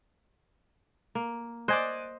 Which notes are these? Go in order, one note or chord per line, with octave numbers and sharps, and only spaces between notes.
A#3
C5 D5 D#5 G#5 F#6